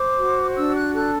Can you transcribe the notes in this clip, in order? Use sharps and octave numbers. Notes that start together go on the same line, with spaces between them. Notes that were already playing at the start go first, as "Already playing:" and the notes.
Already playing: C5 D6
F#4
D4 E6
F#6
A4 F#6